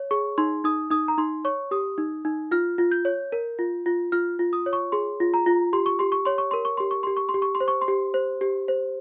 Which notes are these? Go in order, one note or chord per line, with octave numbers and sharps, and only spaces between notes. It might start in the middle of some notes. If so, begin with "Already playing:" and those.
Already playing: C#5
G#4 C#6
D#4 C6
D#4 D#6
D#4 D#6
A#5
D#4 C6
C#5 C#6
G4 D#6
D#4
D#4
F4 F6
F4
G6
C#5
A#4
F4
F4
F4 F6
F4
D#6
C#5
C#6
G#4 C6
F4
A#5
F4
G4 C6
C#6
G4 C6
C#6
C#5 C6
C#6
A#4 C6
C#6
G4 C6
C#6
G4 C6
C#6
C6
G4
C#6
C6
C5
C#6
C6
G4
C5
G4
C5